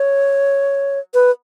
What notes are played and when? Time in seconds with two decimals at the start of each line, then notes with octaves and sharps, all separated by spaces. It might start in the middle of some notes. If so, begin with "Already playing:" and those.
Already playing: C#5
1.14 B4